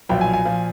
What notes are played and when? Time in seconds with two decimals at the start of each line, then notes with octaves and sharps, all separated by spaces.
0.09 B1 A#2 F3 G5
0.21 G#5
0.33 G#5
0.45 A#2 F3